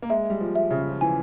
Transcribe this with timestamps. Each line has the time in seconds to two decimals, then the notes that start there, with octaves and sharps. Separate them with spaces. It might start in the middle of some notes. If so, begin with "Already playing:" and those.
0.02 A#3
0.10 G#3 E5
0.30 G3
0.41 F3
0.55 E5
0.71 C#3
0.90 F3
1.01 E3 G#5